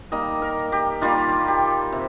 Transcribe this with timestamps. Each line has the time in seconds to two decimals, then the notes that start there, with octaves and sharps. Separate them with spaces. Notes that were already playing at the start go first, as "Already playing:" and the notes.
0.12 D#3 G3 A#3 D#5
0.42 A#4
0.72 G4
1.01 D#3 G3 A#3 F4
1.48 G4
1.92 C3